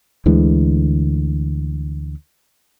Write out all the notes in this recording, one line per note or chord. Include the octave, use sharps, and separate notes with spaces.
D2 D3 E3 G#3